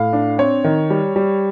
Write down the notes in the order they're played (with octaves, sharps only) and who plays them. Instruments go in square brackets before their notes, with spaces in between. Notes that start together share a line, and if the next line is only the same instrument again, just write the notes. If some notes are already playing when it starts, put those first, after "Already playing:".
Already playing: [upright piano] A2 F5
D4
C4 C#5
D#3
G3
G3